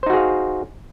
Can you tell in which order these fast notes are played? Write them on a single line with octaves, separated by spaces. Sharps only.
C5 D#4 F#4 G#4 F5